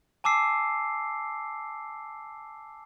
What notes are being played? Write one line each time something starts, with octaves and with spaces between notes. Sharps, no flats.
G#5 A5 D6 E6 C7